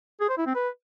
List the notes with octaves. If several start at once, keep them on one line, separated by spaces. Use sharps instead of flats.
G#4
C5
E4
C4
B4